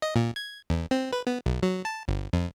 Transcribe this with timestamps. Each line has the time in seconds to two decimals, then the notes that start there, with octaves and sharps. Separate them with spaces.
0.02 D#5
0.16 A#2
0.36 G#6
0.70 E2
0.91 C4
1.13 B4
1.27 B3
1.46 B1
1.63 F#3
1.85 A5
2.08 G1
2.33 F2